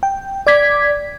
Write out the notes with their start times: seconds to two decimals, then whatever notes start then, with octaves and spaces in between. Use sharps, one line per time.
0.03 G5
0.47 D5 D6 G#6 B6